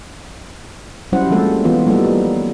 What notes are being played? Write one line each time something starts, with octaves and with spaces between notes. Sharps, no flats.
F#3 G3 C#4 E4 C5 F#5
F3 G3 G#3 A#3 C4 A4
E3 B3 F4
F#3 G3 A#3 D#4 A4